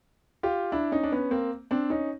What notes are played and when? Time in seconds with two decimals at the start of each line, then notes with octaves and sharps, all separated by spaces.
0.43 F4 G4
0.72 D4 E4
0.92 C#4 D#4
1.03 D4
1.12 B3 C#4
1.31 A#3 C4
1.71 C4 D4
1.90 C#4 D#4